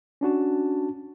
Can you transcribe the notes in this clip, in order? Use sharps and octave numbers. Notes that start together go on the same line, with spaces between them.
C#4 D4 F#4 A5